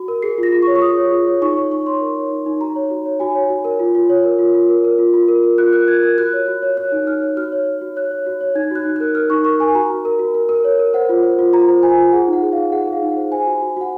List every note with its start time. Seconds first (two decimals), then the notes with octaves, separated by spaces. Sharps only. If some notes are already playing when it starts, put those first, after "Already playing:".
Already playing: F#4
0.08 A#4
0.22 G#4 C7
0.38 F4
0.43 A#6
0.52 F4
0.62 C#6
0.67 C#5
0.75 C#6
0.82 G#4 D#6
0.97 C#5
1.12 F4
1.27 C#5
1.42 D#4 C#6
1.57 C#5 C#6
1.71 D#4 C#6
1.86 C#5 C6
2.01 A#4
2.16 C#5
2.31 D#4
2.46 D#4
2.61 F#4 A#5
2.76 C#5
2.91 F#4
3.05 C#5
3.20 F#4 G#5
3.35 C#5
3.50 F#4
3.64 A#4
3.79 F4
3.95 F4
4.10 C#5
4.24 A#4
4.39 F4
4.54 F4
4.69 A#4
4.84 A#4
4.99 F4
5.14 F4
5.28 A#4
5.43 A#4
5.58 F4 F#6
5.73 A#4 F#6
5.88 A#4 G#6
6.03 A#4 G#6
6.18 F#4 F#6
6.33 C#5
6.48 F#4
6.62 C#5
6.77 C#5 F#6
6.92 D#4
7.07 D#4 F6
7.22 C#5
7.37 F#4 F6
7.52 C#5
7.67 C#5
7.81 F#4
7.96 C#5 F#6
8.11 C#5
8.26 F#4
8.41 C#5
8.55 D#4 G#6
8.71 F#4 F#6
8.85 D#4
8.96 A#4 F#6
9.15 A#4 F6
9.30 D#4 C#6
9.44 A#4 C#6
9.60 A#4 G#5
9.75 F#4 A#5
9.90 F#4
10.05 A#4
10.19 F#4
10.34 A#4
10.49 A#4
10.64 C#5
10.79 A#4
10.94 C5 F#5
11.09 F4
11.23 C5
11.39 F4
11.53 F4 A#5
11.69 C5
11.83 C5 G#5
11.98 F4
12.13 G#4 F#5
12.28 D#4
12.33 F#5
12.42 G#4
12.53 G#4 F5
12.72 G#4 F#5
12.87 G#4 F5
13.02 D#4
13.12 F#5
13.17 C5
13.32 C5 G#5
13.46 F#4
13.62 F#4
13.77 F#4 F#5